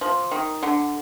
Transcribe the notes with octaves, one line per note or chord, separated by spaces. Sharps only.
F3
D#3
D3